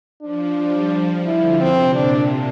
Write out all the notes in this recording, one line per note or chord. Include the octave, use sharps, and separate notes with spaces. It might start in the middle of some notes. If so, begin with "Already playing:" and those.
F3 D4
G3
F3
D3 E4
C3 C4
A#2 D4